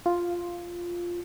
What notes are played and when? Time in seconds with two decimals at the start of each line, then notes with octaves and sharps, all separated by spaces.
0.06 F4